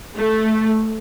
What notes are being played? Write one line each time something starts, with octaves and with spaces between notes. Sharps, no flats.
A3